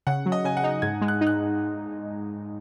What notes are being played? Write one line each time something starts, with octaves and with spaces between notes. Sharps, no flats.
C#3 F#5
F#3
D#5
C#3 G#5
F#5
D#4
G#2 G#6
G#3
F#6
D#4
F#6